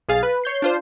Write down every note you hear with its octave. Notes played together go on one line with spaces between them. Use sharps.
B1 G#4 F5 A6
B4
C#5 G6 C7
D4 F4 C5